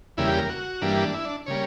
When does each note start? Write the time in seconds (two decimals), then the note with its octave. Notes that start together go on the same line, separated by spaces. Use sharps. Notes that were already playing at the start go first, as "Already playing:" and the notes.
0.17 E2 C#3 G3 A#3 E4
0.27 G4
0.38 A#4
0.49 F#4
0.81 G2 E3 G3 A#3 D4
0.97 D4
1.14 E4
1.25 D4
1.46 C#3 G3 A#3 C#5